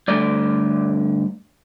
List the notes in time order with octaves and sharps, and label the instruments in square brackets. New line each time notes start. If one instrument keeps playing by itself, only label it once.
[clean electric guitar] G2 D3 A3 D5